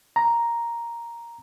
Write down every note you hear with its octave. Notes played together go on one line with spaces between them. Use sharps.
A#5